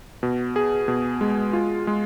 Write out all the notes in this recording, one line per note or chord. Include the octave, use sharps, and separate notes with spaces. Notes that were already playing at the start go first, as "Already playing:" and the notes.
B2
G#4
B2
G#3
F4
G#3